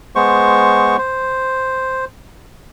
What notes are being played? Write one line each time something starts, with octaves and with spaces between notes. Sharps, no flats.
G#3 B3 C5 C#6
C5